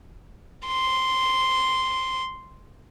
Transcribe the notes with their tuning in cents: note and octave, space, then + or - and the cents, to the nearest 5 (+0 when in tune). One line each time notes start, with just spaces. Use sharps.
C6 -5